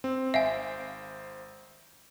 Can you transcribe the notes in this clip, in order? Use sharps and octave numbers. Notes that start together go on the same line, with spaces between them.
C4
G#1 C5 E5 F5 G#5 C7